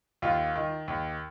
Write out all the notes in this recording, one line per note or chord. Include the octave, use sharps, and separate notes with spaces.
D#2 F4
D#3
D#2